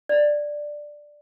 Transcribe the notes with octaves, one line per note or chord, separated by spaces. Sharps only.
D5